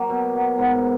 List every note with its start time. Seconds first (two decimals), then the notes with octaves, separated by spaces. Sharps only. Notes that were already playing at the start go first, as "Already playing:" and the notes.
Already playing: F#3 A#3
0.10 B2
0.34 F#3
0.58 G#2 B3